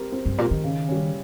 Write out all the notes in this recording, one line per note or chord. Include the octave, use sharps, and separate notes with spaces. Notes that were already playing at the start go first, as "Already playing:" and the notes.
Already playing: C4 G4 A#4
C4
G2
A#2 G4 A#4
D#3
C#3
G3 C#4